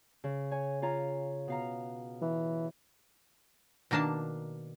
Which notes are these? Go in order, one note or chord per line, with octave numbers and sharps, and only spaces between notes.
C#3
C#5 G#5
F4 C#5 A#5
B2 F5 A#5
E3
B2 D#3 A#3 D4 A5